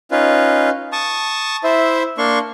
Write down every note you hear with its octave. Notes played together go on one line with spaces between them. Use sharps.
C#4 D#4 F4 B4
A5 C#6 D#6
E4 C5 E5
A#3 D4 C6 C#6